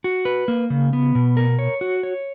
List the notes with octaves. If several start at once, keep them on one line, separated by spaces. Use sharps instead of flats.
F#4
B4
A#3
C#3
B3
B2
A#4
C#5
F#4
C#5